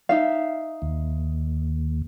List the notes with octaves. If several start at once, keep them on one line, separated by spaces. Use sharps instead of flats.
D#4 E5 F5
D#2